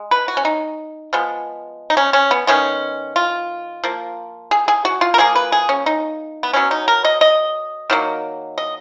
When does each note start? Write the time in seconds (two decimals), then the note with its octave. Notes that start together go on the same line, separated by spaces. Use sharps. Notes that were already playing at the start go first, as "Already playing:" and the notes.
Already playing: G#3
0.11 B4
0.28 F#4
0.37 C#4
0.45 D#4
1.13 F3 G#3 B3
1.90 D#4
1.97 C#4
2.13 C#4
2.31 B3
2.47 D#3 G#3 B3 C#4
3.16 F4
3.84 F3 A#3
4.51 G#4
4.68 G#4
4.85 F#4
5.01 F4
5.14 A#4
5.18 F3 A#3 G#4
5.35 B4
5.52 G#4
5.69 C#4
5.86 D#4
6.43 B3
6.53 B2 F#3 B3 C#4
6.71 D#4
6.88 A#4
7.05 D#5
7.21 D#5
7.90 D#3 F#3 A#3
8.58 D#5